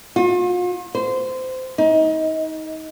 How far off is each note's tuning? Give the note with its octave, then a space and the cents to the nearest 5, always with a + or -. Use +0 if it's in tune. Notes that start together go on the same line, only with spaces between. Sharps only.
F4 +40
C5 -20
D#4 +25